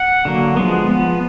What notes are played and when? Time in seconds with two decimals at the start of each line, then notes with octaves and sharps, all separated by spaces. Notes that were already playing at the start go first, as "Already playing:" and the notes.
Already playing: F#5
0.25 D3 F#3 A#3
0.57 F3 G#3 B3
0.90 F3 B3